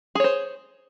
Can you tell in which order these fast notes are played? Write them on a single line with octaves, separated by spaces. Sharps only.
G#4 C#5 C5